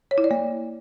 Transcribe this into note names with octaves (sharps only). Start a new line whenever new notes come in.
C#5
E4
D5
A#3